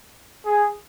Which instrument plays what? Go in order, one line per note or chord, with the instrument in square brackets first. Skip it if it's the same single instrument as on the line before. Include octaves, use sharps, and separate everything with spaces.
[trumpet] G#4